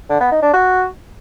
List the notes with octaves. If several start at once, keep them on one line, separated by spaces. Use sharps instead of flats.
D3
B3
D#4
D4
F#4